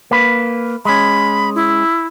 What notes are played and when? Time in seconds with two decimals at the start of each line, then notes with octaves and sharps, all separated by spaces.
0.11 A#3 B4
0.85 G#3 C#4 B5
1.55 E4